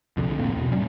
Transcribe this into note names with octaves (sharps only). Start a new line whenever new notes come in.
C2 F2 D3
F1 A2 A#3 C4
E2 B2
A2 F#3 G3 C#4